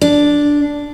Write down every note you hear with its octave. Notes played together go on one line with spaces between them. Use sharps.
D4